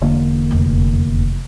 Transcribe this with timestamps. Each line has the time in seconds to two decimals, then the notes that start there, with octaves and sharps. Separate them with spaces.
0.01 E1 D3 A#3
0.51 F1 D#2